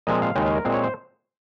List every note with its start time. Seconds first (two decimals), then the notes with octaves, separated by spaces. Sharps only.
0.07 A#2 F3 G#3 C4 D#5
0.22 F5
0.35 D#2 C#3 G#3 C#4 G5
0.46 F5
0.55 A#4
0.65 A#2 G#3 C4
0.74 C#5
0.83 C5